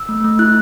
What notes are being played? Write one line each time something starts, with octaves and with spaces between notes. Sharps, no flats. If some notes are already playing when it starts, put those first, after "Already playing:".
Already playing: E6
A3
A3
E4 F#6